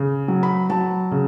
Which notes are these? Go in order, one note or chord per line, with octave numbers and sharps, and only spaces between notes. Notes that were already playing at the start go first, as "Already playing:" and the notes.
Already playing: C#3
F#3
B5
F#3 A5
C#3